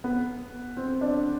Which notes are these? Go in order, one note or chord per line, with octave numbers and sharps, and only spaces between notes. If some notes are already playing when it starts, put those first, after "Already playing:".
B3
C4
D4